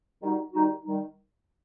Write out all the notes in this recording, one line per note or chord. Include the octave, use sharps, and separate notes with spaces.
D#3 G3 D#4 F#4
D#3 G3 D#4 F#4
D#3 G3 D#4